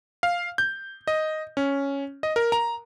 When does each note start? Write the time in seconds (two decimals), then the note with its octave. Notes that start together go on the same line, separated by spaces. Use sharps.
0.23 F5
0.58 G6
1.07 D#5
1.57 C#4
2.23 D#5
2.36 A#4
2.52 A#5